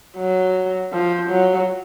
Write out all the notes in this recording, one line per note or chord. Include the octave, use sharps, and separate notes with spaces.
F#3
F3
F#3